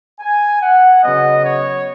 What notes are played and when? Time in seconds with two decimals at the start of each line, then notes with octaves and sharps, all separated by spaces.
0.20 G#5
0.62 F#5
1.02 C#3 F#3 B3 D#5
1.43 C#5